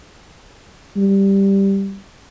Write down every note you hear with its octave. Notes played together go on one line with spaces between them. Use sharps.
G3